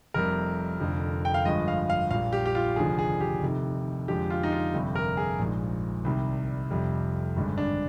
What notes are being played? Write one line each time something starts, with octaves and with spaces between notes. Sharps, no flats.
F1 F2 C3 G3 A#4
F1 F2 D3 F3
G5
F5
G1 G2 F3 G#3 D#5
F5
F5
A#1 A#2 G3 F5
G4
G4
F4
F1 D#2 D3 F3 G#4
G#4
G4
F1 F2 C3 D#3
F2 D3 F3 G#3 G4
F4
D#4
F4
G1 F2 C3 G3
A#4
G#4
A#1 G#2 F3
C2 C3 D#3 G3
F1 F2 C3 G3
G#1 G2 D3 G#3
D4